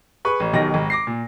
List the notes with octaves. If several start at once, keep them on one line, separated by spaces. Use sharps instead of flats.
G#4 B4 C#6
A1
B1 B2 D#3 G4 A#6
G#1
D6 A#6 C7
A#2